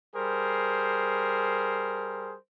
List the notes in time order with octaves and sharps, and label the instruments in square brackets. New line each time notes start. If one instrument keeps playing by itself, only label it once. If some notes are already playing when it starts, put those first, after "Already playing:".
[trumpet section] G3 G#4 A#4 C5